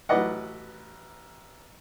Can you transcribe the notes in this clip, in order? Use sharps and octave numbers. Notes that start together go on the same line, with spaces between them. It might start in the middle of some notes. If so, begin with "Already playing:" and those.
A1 F#3 B4 D5 D#5 F#5